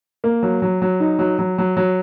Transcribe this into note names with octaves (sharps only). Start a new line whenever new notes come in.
A#3
F#3
F#3
F#3
D#4
F#3
F#3
F#3
F#3